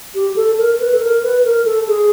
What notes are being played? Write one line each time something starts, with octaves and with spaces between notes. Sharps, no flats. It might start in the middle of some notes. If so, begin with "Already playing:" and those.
G4
A4
A#4
B4
A4
A#4
B4
A#4
A4
G#4